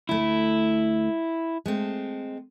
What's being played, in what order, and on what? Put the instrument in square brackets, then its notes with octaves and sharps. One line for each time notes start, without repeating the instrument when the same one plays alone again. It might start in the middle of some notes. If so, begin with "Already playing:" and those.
[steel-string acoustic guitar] D2 A3 [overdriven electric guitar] E4
[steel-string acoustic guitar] G#3 A3 C4